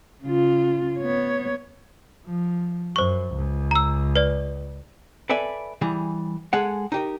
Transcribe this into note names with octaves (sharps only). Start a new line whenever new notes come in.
C#3 F4
B3 C#5
F3
F#2 C5 C#6
C#2
A#5 E6
B4 D5
A4 B4 D5 E5 G#5
E3 G3 G#4
G#3 G#4 A4 F#5
D#4 G4 A#4